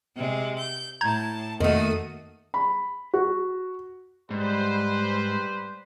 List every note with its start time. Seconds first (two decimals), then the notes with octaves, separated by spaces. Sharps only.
0.16 C3 G#3
0.59 G6
1.01 A2 A5 A#5 G6 G#6
1.60 F2 D#3 A3 A#3 F#4 D#6
2.54 B5
3.14 F#4
4.31 G#2 G3 B4 C5